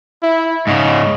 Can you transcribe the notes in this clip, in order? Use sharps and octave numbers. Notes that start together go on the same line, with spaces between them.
E4
G#2 C#3 D#5